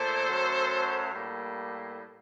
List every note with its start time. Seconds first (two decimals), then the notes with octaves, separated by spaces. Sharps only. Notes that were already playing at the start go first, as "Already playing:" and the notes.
Already playing: A#2 A3 A4 C5
0.27 F#2 F#3 A3
1.13 A2 G3 A#3